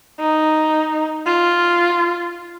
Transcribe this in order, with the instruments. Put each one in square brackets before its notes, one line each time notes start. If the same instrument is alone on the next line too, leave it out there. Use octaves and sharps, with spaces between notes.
[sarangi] D#4
F4